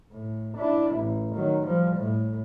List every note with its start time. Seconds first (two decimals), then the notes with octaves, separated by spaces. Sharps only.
0.12 A2
0.58 D4 E4
0.95 A1
1.36 D#3 F#3
1.66 F3 G3
1.97 A2